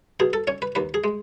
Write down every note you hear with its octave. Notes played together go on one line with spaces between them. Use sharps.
B2 G#4
A4
C#4 C#5
B4
D#2 B4
G#4
G#3